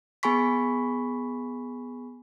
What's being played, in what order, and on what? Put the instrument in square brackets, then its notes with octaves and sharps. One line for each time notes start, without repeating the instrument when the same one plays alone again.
[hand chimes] B3 G#4 G#5 B5 C#6 B6